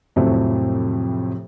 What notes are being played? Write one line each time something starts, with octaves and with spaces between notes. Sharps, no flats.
F2 A2 C3 F#3 A3 C4